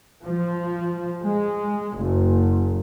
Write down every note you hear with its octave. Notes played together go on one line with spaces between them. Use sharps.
F3
G#3
F#1